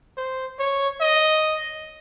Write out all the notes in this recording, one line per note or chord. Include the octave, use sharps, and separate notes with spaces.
C5
C#5
D#5